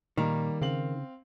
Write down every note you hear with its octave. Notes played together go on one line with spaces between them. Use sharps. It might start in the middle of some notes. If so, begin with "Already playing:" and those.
A#2 D#3 G3 A#3 A#5
C#3 C4 F5 F#7